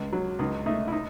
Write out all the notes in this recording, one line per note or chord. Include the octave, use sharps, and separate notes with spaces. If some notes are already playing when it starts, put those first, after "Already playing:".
Already playing: C#2
F#3
C#2 D#4
A3 D#4
E4
D#4